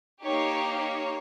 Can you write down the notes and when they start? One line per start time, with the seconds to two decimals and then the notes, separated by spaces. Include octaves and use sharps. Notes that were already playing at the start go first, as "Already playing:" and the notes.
0.22 A#3 D#4 G4 C#5
0.76 C#5